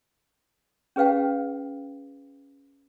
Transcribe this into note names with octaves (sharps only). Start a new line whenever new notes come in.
C#4 G#4 B4 F5 G5